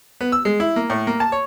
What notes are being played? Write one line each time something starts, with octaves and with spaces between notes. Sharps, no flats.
B3
E6
G#3
E4
A#3
A2
A#3
A5
C#5